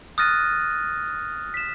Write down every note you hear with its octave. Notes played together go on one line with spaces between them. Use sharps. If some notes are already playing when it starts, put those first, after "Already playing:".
D#6 F6 F#6 A6 A#6 D#7
B6 E7